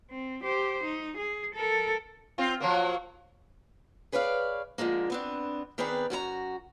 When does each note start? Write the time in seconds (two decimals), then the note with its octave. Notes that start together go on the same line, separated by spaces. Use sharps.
0.11 C4
0.43 G4 C5
0.84 D#4
1.17 G#4
1.54 A4 A#4
2.38 C4 F4
2.60 F3 F#3 A#3
4.12 G#4 B4 C#5 D5 F5
4.78 D3 F3 G#3 A#3
5.10 B3 C4 D4
5.78 D#3 B3 C4 G#4 B4 D5
6.10 F#2 F#4 A4 A#5